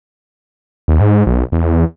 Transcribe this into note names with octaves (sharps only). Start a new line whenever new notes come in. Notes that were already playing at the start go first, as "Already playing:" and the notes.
D#2
G#2
B1
E2